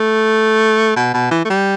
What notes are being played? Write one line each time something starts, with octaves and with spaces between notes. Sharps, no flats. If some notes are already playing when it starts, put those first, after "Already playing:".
Already playing: A3
B2
B2
E3
A3
G3